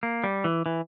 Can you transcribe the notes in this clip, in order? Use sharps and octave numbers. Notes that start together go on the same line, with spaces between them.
A#3
G3
E3
E3